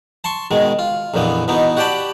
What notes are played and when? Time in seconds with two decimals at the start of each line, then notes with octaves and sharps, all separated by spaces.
0.24 A5 C6 C#6
0.51 B2 D#3 G#3
0.79 F4
1.14 A#1 F2 A#2 E3 B3
1.48 B2 E3 B3 D#4
1.77 F#4 G4 D5 G5 A5 B5